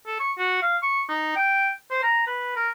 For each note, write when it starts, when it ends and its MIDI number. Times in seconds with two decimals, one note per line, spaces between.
0.06 0.20 69
0.20 0.32 85
0.38 0.61 66
0.62 0.77 77
0.83 1.03 85
1.09 1.34 63
1.36 1.71 79
1.91 2.02 72
2.03 2.24 82
2.27 2.51 71
2.56 2.69 70